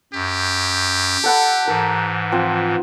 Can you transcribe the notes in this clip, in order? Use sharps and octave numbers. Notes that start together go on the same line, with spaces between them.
F#2 G4
A4 F#5 B5
G#2 E3 A#4
F3 C4